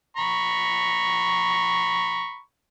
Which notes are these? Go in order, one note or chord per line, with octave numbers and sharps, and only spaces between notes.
A#5 B5 C#6